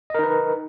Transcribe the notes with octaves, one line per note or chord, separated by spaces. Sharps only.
D#4 A#4 B4 D#5